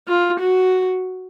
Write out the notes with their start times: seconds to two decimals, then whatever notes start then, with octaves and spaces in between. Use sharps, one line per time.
0.08 F4
0.40 F#4